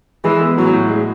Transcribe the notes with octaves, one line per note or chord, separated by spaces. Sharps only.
E3 G#3
B3
A2 F#3
A2
G#3